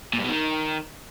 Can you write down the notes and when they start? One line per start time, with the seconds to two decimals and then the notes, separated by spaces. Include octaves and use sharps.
0.14 A#2
0.19 G2
0.24 B2
0.29 D#3